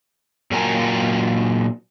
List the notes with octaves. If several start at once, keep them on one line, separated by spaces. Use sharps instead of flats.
A#2 F#3 A#4 G5 G#5 A#5